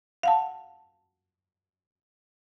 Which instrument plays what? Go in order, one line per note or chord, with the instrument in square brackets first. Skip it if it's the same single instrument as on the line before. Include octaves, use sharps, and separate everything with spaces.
[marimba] F5 F#5 A5